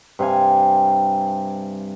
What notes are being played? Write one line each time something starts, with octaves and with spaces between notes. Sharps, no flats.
G2 C3 F5 G#5